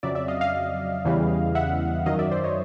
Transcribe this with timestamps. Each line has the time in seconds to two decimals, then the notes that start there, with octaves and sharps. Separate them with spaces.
0.03 F2 C#3 F#3 D5 E5
0.15 D5 E5
0.28 D#5 F5
0.41 D#5 F5
1.05 E2 C#3 E3 G3
1.55 E5 F#5
2.06 F#2 D#3 F#3 D#5 F5
2.19 D5 E5
2.31 C5 D5
2.44 C#5 D#5